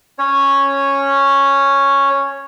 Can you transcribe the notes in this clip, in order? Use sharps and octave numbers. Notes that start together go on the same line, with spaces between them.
C#4 C#5